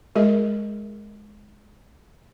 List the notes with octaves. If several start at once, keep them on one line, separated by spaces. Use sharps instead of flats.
G#3 G#4 A#4 D#5